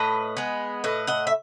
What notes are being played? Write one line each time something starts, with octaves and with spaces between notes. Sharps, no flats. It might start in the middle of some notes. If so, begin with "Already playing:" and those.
Already playing: A2 B4 D#5
G#3 B3
A2 B4 D#5
D#5 F#5
E5